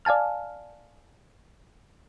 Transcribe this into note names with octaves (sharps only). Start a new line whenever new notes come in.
D5 F5 G#5 A5 F6